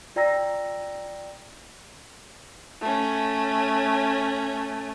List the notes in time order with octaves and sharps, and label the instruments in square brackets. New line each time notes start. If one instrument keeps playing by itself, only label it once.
[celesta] F4 D5 G5 A#5 E6 A#6
[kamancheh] A3 C#4